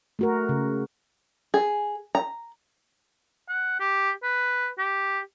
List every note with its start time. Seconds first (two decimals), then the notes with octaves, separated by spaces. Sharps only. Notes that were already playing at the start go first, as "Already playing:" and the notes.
0.19 A3 F#4 A#4
0.49 C#3
1.54 G#4
2.15 A#5
3.49 F#5
3.80 G4
4.23 B4
4.78 G4